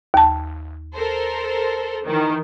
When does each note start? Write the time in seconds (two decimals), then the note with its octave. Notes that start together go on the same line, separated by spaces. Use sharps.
0.14 D#2 A5
0.96 A4 A#4 C5
2.05 D#3 E3